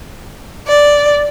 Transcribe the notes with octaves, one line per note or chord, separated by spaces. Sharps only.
D5